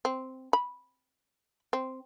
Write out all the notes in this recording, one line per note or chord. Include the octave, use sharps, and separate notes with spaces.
C4
B5
C4